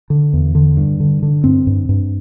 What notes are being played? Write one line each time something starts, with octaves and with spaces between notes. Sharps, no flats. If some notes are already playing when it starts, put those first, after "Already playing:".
D3
E2
D3
G2
D3
D3
G2 C4
G2
G2